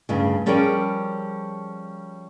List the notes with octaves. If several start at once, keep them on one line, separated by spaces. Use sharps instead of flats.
D2 G2 C#3
F3 G3 C#4 G#4 A#4 D5